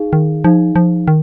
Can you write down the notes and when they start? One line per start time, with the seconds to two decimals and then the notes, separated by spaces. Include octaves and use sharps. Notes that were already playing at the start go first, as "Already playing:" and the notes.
Already playing: D#4 G#4 F5
0.13 D#3
0.44 F3 D#4 G#4 F5
0.76 F3
1.08 D#3